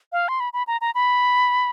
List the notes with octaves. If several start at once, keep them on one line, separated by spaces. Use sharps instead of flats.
F5
C6
B5
B5
A#5
A#5
B5